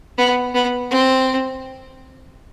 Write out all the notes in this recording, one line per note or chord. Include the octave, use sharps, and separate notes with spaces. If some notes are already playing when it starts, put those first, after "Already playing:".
B3
B3
C4